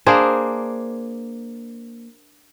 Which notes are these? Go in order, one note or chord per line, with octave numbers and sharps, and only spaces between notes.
A#3 D4 G#4 C5